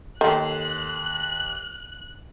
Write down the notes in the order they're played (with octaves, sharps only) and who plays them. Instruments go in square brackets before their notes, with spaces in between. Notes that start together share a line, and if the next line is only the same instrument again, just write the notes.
[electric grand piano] D#2 C6 [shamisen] D#3 [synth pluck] A4 C7 [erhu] F#6